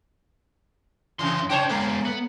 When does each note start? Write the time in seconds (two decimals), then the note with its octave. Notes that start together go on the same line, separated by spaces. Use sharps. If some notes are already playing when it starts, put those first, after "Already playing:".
1.19 F#2 C3 E3 C6
1.50 C#3 C#4 C5 C#5 G5
1.69 G#3 A3 B3
2.05 B3